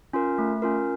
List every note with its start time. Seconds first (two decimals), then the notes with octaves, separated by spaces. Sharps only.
0.13 C#4 F4 A#4
0.38 A3
0.62 C#4 F4 A#4